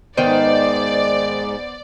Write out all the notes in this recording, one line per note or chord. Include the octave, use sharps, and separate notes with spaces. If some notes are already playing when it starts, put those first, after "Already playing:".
G#2 D#3 B3 D#4 C5 D5 G5